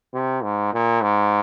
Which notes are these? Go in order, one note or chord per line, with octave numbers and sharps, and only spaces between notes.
C3
G#2
A#2
G#2